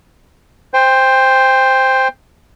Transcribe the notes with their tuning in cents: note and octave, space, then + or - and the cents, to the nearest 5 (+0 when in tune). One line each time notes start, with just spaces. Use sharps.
C5 +0 G5 +25